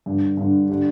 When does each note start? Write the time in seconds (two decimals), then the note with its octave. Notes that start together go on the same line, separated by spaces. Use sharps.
0.06 G2 D3
0.37 G2 D3
0.69 D3 G3